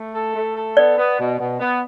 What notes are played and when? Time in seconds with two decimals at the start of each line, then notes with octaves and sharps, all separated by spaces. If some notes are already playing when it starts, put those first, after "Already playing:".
Already playing: A3
0.14 A4
0.34 A3
0.56 A4
0.77 B3 D5
0.98 B3
1.19 B2
1.38 B2
1.60 B3